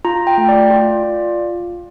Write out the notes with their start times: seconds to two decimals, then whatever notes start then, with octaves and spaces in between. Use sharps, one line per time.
0.05 F4 A#5
0.27 G5
0.38 A3
0.48 D5
0.70 F4
1.04 F4